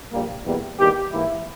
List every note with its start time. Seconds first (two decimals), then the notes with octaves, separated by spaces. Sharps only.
0.11 A#1 A#2 G3 A#3
0.44 E2 B2 G3 A#3
0.78 E2 D#3 G3 A#3 G4
1.11 G#2 E3 A#3 E4